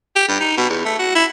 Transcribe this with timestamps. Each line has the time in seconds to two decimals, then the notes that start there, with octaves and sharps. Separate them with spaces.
0.15 G4
0.28 G2
0.40 D#4
0.57 B2
0.69 E2
0.85 A3
0.99 F#4
1.15 E4